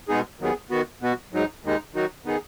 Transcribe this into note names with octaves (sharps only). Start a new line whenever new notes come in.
B2 G#3 B3 D#4 G#4
D#2 D#3 F#3 B3 G#4
D#3 B3 F#4
B2 B3 F#4
G#2 F#3 D#4
D#2 D#3 G#3 D#4
D#3 F#3 D#4 F#4
D#3 B3 D#4 G#4